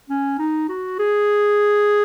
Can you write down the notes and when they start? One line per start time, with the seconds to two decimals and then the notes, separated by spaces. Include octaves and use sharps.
0.09 C#4
0.39 D#4
0.69 F#4
0.99 G#4